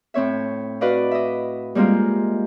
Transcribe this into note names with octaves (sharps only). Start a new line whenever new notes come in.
A2 C4 C#5 E5
F#4 B4 D5 D#5 F5
D#5 E5
G3 G#3 A#3 C4 F4